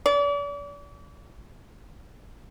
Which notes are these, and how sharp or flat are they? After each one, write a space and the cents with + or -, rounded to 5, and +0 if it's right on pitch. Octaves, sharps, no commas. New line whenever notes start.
D5 -40